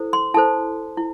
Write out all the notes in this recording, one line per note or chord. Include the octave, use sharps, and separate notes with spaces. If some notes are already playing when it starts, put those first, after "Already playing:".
Already playing: E4 A4 C5
C6
E4 A4 C5 A5
E4